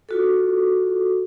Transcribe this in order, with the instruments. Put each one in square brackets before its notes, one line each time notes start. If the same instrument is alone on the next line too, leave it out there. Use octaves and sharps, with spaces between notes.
[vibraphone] F4 F#4 A4